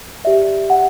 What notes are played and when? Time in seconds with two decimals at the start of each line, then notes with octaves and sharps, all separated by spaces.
0.24 G4 D5 E5
0.70 F#5